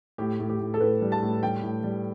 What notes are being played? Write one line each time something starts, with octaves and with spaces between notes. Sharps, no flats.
A2 G4
A2
G4
A2
A4
A2 B4
G3
A5
A2
G3 G5
A2
G3